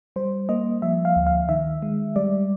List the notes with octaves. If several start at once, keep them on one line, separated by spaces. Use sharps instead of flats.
G3 C5
A#3 D#5
F3 E5
F5
D2
F5
D#3 E5
G#3
G3 D5